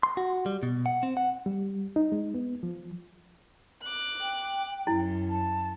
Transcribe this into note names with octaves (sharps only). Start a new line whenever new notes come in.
C6
F#4
G3
B2
F#5
C4
F#5
G3
D#4
G#3
B3
F3
D6 F#6
G5
F#2 E4
A5